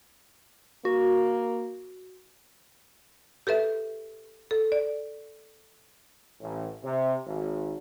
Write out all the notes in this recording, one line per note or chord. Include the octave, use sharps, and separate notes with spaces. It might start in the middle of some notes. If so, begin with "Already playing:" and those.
A#3 F#4
G4 A4 B4 E5
A4
D5
A1
C3
G#1